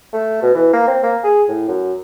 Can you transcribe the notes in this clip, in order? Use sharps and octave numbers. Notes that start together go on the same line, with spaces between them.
A3
B2
E3
A#3
C4
A#3
G#4
A2
F#2